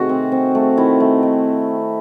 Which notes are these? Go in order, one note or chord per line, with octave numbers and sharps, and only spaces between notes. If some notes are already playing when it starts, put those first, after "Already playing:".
Already playing: C3 D#3 A3 F#4 G#4
C4
C4
A3
D#3 E4
A3
D#3